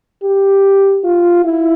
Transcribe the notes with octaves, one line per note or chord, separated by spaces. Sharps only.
G4
F4
E4